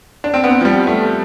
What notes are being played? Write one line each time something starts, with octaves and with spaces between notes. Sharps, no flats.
D4
C4
B3
F3
G3
A3